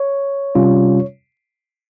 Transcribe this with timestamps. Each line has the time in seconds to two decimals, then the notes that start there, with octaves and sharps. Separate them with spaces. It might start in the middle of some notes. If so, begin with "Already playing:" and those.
Already playing: C#5
0.55 C3 G3 C#4 F4